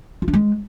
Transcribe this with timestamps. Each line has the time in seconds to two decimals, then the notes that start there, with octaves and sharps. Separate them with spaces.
0.22 F4
0.28 D4
0.33 G#3